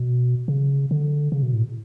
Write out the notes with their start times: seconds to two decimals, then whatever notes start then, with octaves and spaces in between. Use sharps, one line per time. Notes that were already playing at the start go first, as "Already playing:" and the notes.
Already playing: B2
0.48 C#3
0.91 D3
1.32 C#3
1.43 B2
1.54 A2